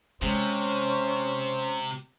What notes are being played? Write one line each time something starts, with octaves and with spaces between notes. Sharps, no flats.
C3 G#3 C#4 C5